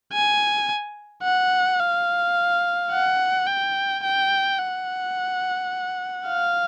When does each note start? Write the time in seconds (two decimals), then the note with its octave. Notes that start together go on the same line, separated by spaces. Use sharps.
0.13 G#5
1.23 F#5
1.80 F5
2.91 F#5
3.47 G5
4.03 G5
4.59 F#5
6.26 F5